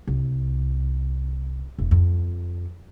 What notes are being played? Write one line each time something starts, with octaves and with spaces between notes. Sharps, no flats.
C2
E1
F2